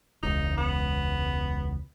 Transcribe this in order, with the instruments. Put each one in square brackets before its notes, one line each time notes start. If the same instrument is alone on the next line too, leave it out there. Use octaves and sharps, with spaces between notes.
[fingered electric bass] E1 C#2 [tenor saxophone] D#4
[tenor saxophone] B3